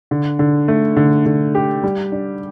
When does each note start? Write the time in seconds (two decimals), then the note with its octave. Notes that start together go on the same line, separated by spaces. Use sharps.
0.11 D3
0.39 D3
0.68 A3
0.96 D3
1.26 D3
1.55 G4
1.83 G3
2.12 D4